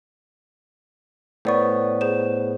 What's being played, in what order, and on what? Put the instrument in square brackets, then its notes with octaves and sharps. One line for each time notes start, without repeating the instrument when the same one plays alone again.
[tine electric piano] A2 B3 [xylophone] C5 D5 C#6
[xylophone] G#4 C5 E7